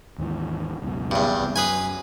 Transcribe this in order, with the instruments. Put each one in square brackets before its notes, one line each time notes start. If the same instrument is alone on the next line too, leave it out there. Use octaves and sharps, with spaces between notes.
[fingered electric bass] D#2 G#2 E3
C#2 F#2 B2
[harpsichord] E2 G2
[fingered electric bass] C2
[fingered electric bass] F#2 [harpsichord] G#4 B4 G#5